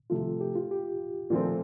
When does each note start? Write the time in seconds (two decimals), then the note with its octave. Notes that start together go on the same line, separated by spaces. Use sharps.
0.10 C3 F3 A3 F4
0.41 G4
0.56 F4
0.71 G4
1.30 A#2 F3 A3 C4 F4